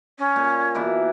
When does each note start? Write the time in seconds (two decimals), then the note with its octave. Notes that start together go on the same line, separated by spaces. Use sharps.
0.18 C#4
0.36 A#2
0.75 B2 E3 A#3